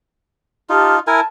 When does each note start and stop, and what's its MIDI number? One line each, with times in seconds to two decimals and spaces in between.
0.69 0.99 63
0.69 0.99 65
0.69 0.95 67
0.69 0.95 81
0.69 0.95 89
1.07 1.20 64
1.07 1.20 70
1.07 1.20 80
1.07 1.25 81